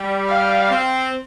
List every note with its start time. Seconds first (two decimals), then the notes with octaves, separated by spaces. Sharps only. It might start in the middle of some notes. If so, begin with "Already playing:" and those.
Already playing: G3
0.29 F5
0.69 C4